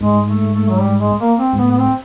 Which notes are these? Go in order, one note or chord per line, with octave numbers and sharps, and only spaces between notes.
G#2 G#3
A3
A3
F#3
G3
G#3
A#3
C4
G#2
A2 B3
B3
C4